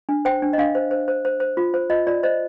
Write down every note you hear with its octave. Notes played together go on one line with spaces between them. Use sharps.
D4
C5 G5
D4
D#5
D4 F5
C5
C5
C5
C5
C5
F4
C5
F4 D#5
F4 D5
C5 D#5